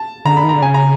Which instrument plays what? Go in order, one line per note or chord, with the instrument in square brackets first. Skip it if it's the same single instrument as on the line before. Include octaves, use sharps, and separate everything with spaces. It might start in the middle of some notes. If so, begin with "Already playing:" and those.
Already playing: [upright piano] A5
[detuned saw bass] D3 [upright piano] A#5
[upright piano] B5
[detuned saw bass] D#3
[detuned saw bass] D3 [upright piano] A#5
[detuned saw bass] C#3 [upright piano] G#5
[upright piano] A#5